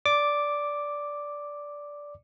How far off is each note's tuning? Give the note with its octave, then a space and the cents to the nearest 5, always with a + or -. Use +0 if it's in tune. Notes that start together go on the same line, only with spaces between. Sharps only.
D5 -10 D6 +0